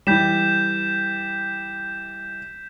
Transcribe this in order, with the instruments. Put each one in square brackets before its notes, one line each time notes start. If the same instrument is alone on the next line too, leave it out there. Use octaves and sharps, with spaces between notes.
[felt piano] E3 G3 [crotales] G6 B6 E7